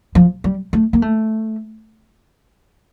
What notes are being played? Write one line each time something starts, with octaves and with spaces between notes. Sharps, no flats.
F3
G3
A3
A#3
A3